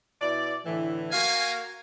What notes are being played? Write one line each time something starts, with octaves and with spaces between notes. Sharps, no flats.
B2 E4 D5
A2 D3 E3
A#3 F#4 A#4 F5 G#5